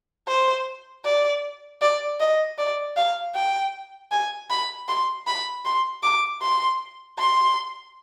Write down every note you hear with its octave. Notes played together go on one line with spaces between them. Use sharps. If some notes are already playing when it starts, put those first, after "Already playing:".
C5
D5
D5
D#5
D5
F5
G5
G#5
B5
C6
B5
C6
D6
C6
C6